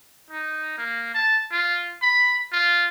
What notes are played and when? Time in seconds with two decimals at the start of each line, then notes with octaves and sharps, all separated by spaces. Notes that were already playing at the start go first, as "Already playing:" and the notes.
0.31 D#4
0.78 A#3
1.14 A5
1.52 F4
2.02 B5
2.53 F4